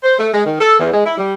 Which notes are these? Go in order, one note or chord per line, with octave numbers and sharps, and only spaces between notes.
C5
A3
G#3
D#3
A4
E2
G#3
E4
G3